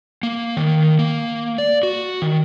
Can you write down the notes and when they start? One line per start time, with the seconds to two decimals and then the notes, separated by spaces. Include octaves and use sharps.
0.23 A#3
0.57 D#3
0.99 A#3
1.58 D5
1.83 F#4
2.22 D#3